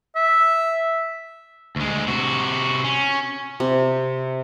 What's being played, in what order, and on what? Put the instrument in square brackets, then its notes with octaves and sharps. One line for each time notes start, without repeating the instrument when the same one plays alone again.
[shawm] E5
[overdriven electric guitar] D2 G#3
C3 F#4
C#4
[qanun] C3